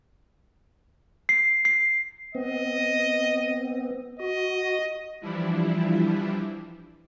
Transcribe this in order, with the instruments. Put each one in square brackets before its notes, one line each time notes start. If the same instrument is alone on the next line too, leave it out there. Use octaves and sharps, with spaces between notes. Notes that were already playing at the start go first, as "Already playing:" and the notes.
[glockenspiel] C7
C7
[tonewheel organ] B3 C4 [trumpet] D#5
[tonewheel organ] F#4 [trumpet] D#5
[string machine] E3 F3 G3 D4 E4